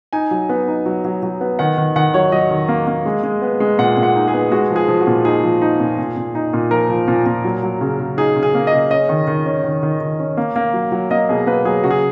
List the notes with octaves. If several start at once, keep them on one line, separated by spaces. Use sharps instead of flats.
D#4 G#5
F#3
B3
D#4
F#3
F#3
F#3
B3
D#3 F#5
D#3
D#3 F#5
F#3 C#5
F#3 D#5
D#3
A#3
A#3
G#3
G#3
B3
G#3
A#2 F#5
A#2
F#5
D#4
G#4
B3
G#3 F#4
F3
G#4
F3
F#4
A#2
D#4 G#4
F3
D#4
A#2
A#2
A#2
D#4
A#2
F3 A#4
F3
A#2
A#2
F#3
F#3
C#3
C#3
D#4 G#4
C#3
G#4
A#3
D#5
C#3
C#4 D#5
D#3
D#3
C#4
D#3
D#3
D#3
C#4
A#3
A#3
F#3
F#3
A#3 D#5
B2 G#4
A#3 B4
F#3 G#4
C#3 F#4
G#4